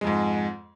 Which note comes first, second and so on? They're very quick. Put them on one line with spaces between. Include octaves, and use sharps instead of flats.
G#3 F2 G#2